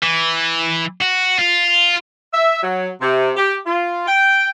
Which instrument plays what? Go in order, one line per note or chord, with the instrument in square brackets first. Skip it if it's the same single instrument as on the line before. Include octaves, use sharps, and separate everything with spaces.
[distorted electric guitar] E3
F#4
F4
[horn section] E5
F#3
C3
G4
F4
G5